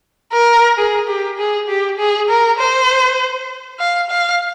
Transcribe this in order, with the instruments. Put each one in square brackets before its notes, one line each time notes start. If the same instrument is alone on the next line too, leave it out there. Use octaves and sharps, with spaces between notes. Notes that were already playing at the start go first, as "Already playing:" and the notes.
[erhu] A#4
G#4
G4
G#4
G4
G#4
A#4
C5
F5
F5